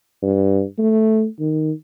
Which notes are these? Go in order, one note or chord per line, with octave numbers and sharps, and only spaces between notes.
G2
A3
D#3